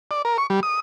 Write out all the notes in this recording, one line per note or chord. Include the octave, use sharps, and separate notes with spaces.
D5
A#4
C#6
G3
D#6